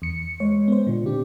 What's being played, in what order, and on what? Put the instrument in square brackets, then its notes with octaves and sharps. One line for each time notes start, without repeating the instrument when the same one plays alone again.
[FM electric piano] E2 C#7
[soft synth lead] G#3 [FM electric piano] C#5
[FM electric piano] B3 C5
[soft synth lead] A#2 [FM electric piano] D3
[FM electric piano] C4 D4 [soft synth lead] G4